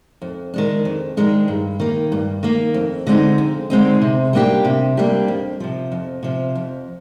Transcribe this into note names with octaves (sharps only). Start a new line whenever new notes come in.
F2
D#3 G#3 D4
F2
D#3 G#3 D4
G2
D#3 A#3
G2
D#3 A#3
F2
D3 G#3 C4 D#4
F2
D3 G#3 C4 D#4
C3
G3 A#3 D4 G4
C3
G3 A#3 D4 G4
F2
C3 F3
F2
C3 F3
F2